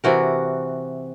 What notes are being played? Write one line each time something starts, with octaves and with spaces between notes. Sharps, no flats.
C3 E3 F#4 A#4